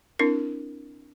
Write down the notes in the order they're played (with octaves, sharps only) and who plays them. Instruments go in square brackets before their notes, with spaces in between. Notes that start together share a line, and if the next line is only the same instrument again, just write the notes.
[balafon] C4 D4 E4 A#4